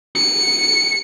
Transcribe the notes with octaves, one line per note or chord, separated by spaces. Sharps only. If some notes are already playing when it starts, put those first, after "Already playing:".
C#7